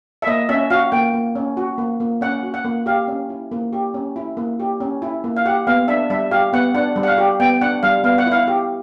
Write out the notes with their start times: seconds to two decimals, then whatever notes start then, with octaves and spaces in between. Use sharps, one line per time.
0.22 E5
0.27 A#3 D#5
0.49 C#4 E5
0.70 F#4 F5
0.92 A#3 G5
1.14 A#3
1.35 C#4
1.57 F#4
1.78 A#3
2.00 A#3
2.21 C#4 F#5
2.43 F#4
2.54 F#5
2.65 A#3
2.86 G4 F5
3.08 C#4
3.29 E4
3.52 A#3
3.73 G4
3.94 C#4
4.16 E4
4.37 A#3
4.60 G4
4.80 C#4
5.02 E4
5.24 A#3
5.37 F5
5.45 G4 F#5
5.67 B3 F5
5.88 D4 E5
6.10 G3 E5
6.31 G4 F5
6.53 B3 F#5
6.75 D4 F#5
6.96 G3
7.03 F#5
7.07 F5
7.18 G4
7.40 B3 G5
7.61 D4 F#5
7.83 G3 F5
8.04 B3 F5
8.18 F#5
8.26 E4
8.32 F5
8.48 G4